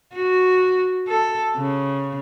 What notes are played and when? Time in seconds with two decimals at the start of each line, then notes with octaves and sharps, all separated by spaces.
0.15 F#4
1.08 A4
1.57 C#3